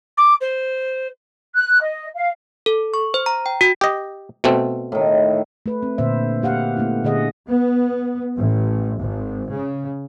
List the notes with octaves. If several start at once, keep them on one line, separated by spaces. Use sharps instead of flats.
D6
C5
F#6
D#5
F5
A4
C#6
C5
A#5
G5
F#4
G4 D#5
B2 A3 C4
A2 D#3
A3 B4
C4
A#2 D3 C5 E5
A#3 G4 F5 F#5
A3 B3 C#4 E4
A#2 D3 G#4 D#5 F#5
B3
A1
G#1
C#3